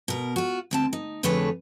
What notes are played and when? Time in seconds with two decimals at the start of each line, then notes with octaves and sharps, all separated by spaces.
0.08 B2 A#4
0.36 F4 F#4
0.71 D2 C4 A5
0.93 D#4
1.23 F2 D3 A3 G#4 B4 C#5